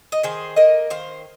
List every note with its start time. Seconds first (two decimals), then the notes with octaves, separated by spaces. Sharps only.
0.12 D#5
0.23 D#3 G#4 C5
0.56 A#3 A#4 D#5
0.90 D#3 C5 F5